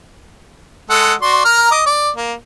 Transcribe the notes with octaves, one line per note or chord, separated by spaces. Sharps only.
G#3 A4 F#5
F#4 D5 C6
A#4 A#5 F6
D#5 D6
D5
A#3